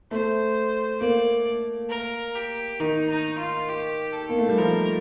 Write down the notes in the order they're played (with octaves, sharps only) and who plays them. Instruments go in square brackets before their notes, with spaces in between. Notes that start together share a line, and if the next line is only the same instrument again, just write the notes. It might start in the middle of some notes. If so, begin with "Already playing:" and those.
[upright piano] A3 [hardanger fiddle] C5
[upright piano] A#3 [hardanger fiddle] D5
[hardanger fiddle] A#4
G4
[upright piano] D#3 [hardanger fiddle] D#4
[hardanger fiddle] D#4
F4
G4
A4
[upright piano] A#3
A3
G3
[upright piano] F3 [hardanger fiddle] A#4